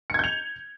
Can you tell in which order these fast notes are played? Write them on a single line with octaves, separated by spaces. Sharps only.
C#7 G#6 G6 F7